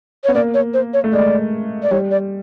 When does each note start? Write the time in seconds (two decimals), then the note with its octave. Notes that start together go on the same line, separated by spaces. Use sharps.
0.24 B3 C#5
0.35 A#3 D5
0.54 C#5
0.74 C5
0.94 C#5
1.04 A3
1.13 G#3 D5
1.83 D5
1.91 G3 C#5
2.11 D5